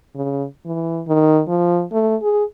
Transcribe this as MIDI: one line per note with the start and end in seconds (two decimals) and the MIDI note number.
0.16 0.46 49
0.65 1.02 52
1.07 1.41 51
1.48 1.84 53
1.92 2.16 57
2.22 2.43 68